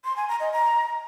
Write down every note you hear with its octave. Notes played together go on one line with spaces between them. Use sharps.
C6
G#5
A#5
D#5
A#5